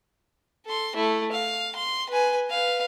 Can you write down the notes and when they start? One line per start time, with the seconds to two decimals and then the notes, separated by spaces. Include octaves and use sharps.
0.66 A4 C6
0.95 A3 E4
1.32 F5
1.76 C6
2.09 B4 G#5
2.48 B4 F5